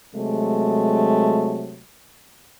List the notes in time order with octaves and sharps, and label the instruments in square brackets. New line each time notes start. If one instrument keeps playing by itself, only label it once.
[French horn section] C3 F#3 G#3 A3